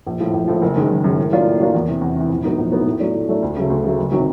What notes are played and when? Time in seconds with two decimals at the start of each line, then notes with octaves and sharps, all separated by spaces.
0.06 A#1
0.20 A2 F3
0.34 A#1
0.48 A2 F3
0.62 F#1
0.75 F#2 D#3 G#3
0.90 F#1
1.04 F#2 D#3 G#3
1.17 A2
1.31 F#3 A#3 D4 F4
1.46 A2
1.60 F#3 A#3 D4 F4
1.75 E2
1.88 C3 E3
2.01 E2
2.16 C3 E3
2.29 A#1
2.43 A2 F#3 B3 D#4
2.58 A#1
2.72 A2 F#3 B3 D#4
2.86 A2
3.00 F#3 A3 D4
3.15 A2
3.28 F#3 A3 D4
3.42 D2
3.57 C#3 F#3 A3
3.70 D2
3.84 C#3 F#3 A3
3.99 F#1
4.12 C3 D#3 F#3